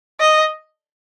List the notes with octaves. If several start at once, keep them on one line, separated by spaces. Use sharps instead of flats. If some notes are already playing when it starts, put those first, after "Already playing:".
D#5